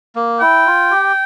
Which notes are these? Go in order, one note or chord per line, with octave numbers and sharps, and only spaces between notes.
A#3
E4 G5
F4
G4